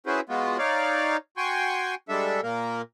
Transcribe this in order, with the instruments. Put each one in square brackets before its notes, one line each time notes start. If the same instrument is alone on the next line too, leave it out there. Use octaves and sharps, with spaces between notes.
[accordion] C#4 E4 F#4 G#4 B4 C5
G#3 B3 F4 F#4
D#4 C#5 D5 F5
F#4 G5 G#5 C6 C#6
G3 G#3 D4 A4 E5
A#2 A#3 A#4